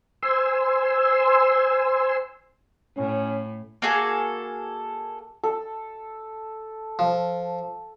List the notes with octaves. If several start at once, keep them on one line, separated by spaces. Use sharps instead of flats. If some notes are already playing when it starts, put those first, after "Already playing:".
C5 G#5 C6 E6
A2 C#4
A#3 F#4 G#4 A4
A4
F3